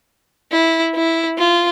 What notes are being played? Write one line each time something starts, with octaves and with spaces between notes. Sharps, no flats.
E4
E4
F4